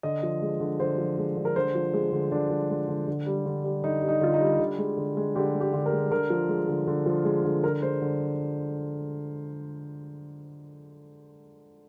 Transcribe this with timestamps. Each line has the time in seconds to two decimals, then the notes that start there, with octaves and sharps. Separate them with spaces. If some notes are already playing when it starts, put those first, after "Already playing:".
0.03 D3 D#5
0.23 F3
0.42 G#3
0.60 D3
0.80 D3 C5
0.98 F3
1.18 G#3
1.37 D3
1.45 A#4
1.56 D3 C5
1.75 F3
1.94 G#3
2.12 D3
2.32 D3 D4
2.50 F3
2.70 G#3
2.88 D3
3.08 D3
3.26 G3
3.46 D3
3.64 G3
3.84 D3 D#4
4.02 G3
4.09 D#4
4.21 D3 F4
4.34 D#4
4.41 G3
4.60 D3
4.78 G#3
4.97 D3
5.17 G#3
5.35 D3 G4
5.54 G#3
5.61 G4
5.74 D3
5.86 A#4
5.92 G#3
6.11 D3 A#4
6.30 F3
6.49 G#3
6.69 D3
6.87 D3
7.06 F3
7.25 G#3
7.45 D3
7.63 D3 A#4
7.82 G#3 C5
8.02 D3